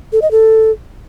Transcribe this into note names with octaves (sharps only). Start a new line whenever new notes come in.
A4
D#5
A4